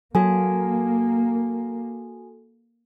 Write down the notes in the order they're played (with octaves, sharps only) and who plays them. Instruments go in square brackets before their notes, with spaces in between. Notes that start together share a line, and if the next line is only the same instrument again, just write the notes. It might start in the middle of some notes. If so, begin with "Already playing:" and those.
[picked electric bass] F#3 [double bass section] A#3 [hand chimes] F#4 A4 G#5